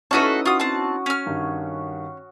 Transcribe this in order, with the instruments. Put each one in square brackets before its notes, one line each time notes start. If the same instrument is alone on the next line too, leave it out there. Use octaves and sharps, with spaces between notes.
[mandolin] A3 F#4 A4 [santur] C#4 D#6 [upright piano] D#4 E4 B4
[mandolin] F4 D#6 [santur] F#4
[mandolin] C4 A5
C#4 F6
[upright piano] G2 D#3